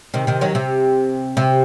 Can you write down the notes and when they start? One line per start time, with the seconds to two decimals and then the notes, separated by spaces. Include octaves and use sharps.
0.14 C3 D#3
0.27 C3 D#3
0.41 D#3 F#3
0.55 C3
1.37 C3